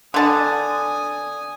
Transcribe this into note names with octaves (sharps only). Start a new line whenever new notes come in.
D3 G#5 A5 D#6